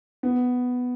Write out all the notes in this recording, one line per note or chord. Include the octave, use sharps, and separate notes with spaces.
B3